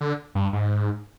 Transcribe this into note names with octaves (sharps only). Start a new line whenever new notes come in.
D3
G2
G#2